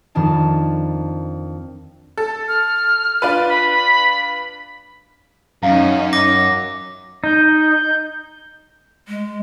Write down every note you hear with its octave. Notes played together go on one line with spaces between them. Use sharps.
F2 D#3 D4 A5
A4
F6
D4 F4 B4
B5
F#2 C#4 D#4 F5 A#5
D6 A#6
D#4 G6
G#3